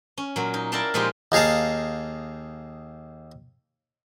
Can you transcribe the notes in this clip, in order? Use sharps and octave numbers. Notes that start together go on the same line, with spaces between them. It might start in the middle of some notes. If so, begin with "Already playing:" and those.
C#4
A#2 F#3
D#4
E4 A#4 D5 F5 G5 A5
A#2 F3 G#3 D#4 F4 G4
D#2 D#4 G#4 F5 A5